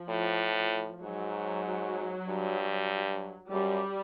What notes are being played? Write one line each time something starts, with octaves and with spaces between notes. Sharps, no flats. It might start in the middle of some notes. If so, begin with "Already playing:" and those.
Already playing: F3
A2
G#2 F#3
G2
F#2 G3